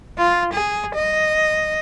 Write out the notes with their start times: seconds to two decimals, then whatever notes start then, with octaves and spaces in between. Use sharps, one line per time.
0.18 F4
0.53 G#4
0.95 D#5